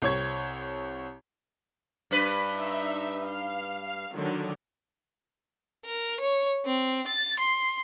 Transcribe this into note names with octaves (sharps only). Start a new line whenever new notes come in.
C2 C4 C#5 C#6 G#6
G2 B4
D#4 E5
F5
D3 D#3 F#3
A#4
C#5
C4
A6
C6